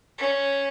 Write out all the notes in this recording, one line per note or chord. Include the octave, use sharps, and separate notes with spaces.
C#4